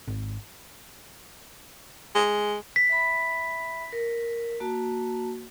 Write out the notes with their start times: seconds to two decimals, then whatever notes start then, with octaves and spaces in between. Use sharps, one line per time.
0.07 G#1
2.15 G#3
2.76 B6
2.89 E5 B5
3.93 A#4
4.60 A#3 F#4 A5